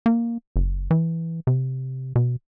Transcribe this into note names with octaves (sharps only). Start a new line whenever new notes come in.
A#3
F#1
E3
C3
B2